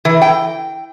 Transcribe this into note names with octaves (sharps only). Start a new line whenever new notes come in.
E3
G5